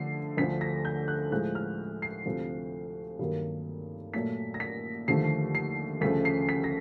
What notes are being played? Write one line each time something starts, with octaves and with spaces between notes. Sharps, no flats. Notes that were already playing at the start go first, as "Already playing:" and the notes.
Already playing: D3 F3 A3 C7
D2 D3 F3 A3 B6
A#6
G6
F#6
A2 F3 G#3 F#6
F6
C7
D2 C3 F3
G2 D#3 F#3 A#3
A#2 F#3 A3 B6
A#6
B6
D#2 D3 F3 A3 C7
C7
D2 C#3 F3 A3 B6
C7
B6
A#6